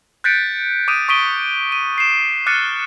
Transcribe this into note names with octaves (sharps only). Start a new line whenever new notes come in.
F#6 G6 A6 B6 C#7 D7
D6 D#6 D7 D#7
C#6 D#6 B6 D7 D#7 G7
D#7
C7 E7
D6 F6 F#6 A6 C#7 D#7